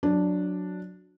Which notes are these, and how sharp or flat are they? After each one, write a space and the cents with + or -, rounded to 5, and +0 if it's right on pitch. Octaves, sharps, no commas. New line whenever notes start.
F#3 -15 D4 +0